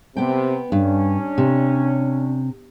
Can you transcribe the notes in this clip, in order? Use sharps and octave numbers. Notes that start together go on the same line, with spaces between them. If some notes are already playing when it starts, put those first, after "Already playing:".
C3 B3 G5
G2 C#4 D4
C3